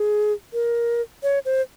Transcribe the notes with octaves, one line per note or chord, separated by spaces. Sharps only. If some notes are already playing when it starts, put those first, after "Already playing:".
Already playing: G#4
A#4
C#5
C5